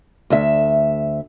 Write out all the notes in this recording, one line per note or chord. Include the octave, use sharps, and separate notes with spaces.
D2 E5